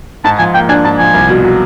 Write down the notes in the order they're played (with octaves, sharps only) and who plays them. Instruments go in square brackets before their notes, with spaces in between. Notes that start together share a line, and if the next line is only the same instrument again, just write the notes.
[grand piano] G#2 [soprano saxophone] A5
[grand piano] F3 [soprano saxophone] G#5
[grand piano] A#3 [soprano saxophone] G5
[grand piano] D4 [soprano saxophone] G#5
[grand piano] G#2 [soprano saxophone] A5
[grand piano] F3 [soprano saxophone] G#5
[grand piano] C2
B2
F#3